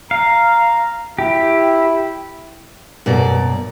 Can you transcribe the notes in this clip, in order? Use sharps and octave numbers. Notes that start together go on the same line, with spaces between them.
F5 A#5
E4 G4
F#2 B2 A#3 D5